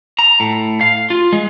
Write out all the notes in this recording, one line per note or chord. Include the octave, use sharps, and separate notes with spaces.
A#5
A2
F5
F4
G#3